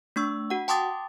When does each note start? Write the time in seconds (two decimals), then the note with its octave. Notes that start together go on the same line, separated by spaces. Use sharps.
0.16 A3 D4 C#6 E6
0.50 F#4 F#5
0.68 G5 A5 C6 D6 D#6 A6